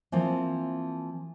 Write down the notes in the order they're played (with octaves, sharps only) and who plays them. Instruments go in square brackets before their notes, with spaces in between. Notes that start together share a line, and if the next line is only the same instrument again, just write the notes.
[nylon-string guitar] E3 F3 A#3 C4